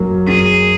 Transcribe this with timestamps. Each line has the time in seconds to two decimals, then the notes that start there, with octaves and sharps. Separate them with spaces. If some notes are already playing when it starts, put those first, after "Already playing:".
Already playing: F#2 F#3 A#3
0.27 F#2 G#4